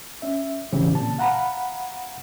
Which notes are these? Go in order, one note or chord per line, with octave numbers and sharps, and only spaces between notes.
C#4 E5
A2 C#3 E3 C4 C#4 G4
A#2 A5
F5 F#5 A#5 B5